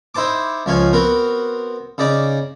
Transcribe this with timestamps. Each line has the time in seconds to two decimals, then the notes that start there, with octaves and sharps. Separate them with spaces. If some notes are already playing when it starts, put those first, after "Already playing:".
0.15 D#4 E4 C5 A5 D6
0.66 C#2 F3 C#5 F5 G#5
0.93 B3 C4 F#4 A#4
1.98 C#3 D#4 D5 D6